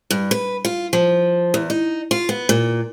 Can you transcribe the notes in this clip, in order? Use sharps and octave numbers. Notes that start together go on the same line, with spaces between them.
G2
B4
F4
F3
E2
D#4
F4
B3
A#2